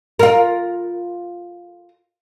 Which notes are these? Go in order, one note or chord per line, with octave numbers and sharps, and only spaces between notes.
F4 A#4